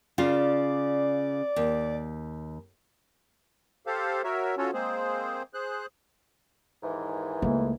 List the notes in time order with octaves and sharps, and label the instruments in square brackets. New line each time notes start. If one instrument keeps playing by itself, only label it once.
[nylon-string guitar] C#3 F4 [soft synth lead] D5
[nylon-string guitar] D#2
[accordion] G4 A4 C5 F5
F#4 A#4 C#5 E5
C#4 F4 F#4 A4 C#5
G#3 A#3 C4 G#4 C5
G#4 C5 F#6
[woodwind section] D#2 G#2 E3
[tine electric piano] C#2 A3 [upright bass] A#3 D#4